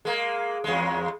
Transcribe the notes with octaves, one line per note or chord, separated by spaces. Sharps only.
G#3 A#3
E2 G#3